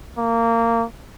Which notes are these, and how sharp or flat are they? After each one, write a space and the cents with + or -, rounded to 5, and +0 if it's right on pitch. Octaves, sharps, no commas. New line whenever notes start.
A#3 -20